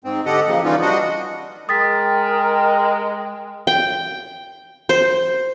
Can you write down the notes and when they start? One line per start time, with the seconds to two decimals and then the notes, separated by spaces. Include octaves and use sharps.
0.04 G#2 C4
0.26 D3 G4 A4 D#5 F#5
0.48 C#3 F3 A#3
0.64 E3 G3 C#4 D#4 F4
0.82 G3 D4 F#4 D#5 F#5
1.69 G#3 A#4 G5 D#6 A6 B6
3.67 G5
4.89 C5